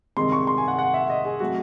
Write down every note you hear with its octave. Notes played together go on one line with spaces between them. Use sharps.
C2 C3 D#3 G#3 C4 C6
C#6
C6
G#5
F#5
F#5
E5
D#5
G#4
F#3 A3 C4 F#4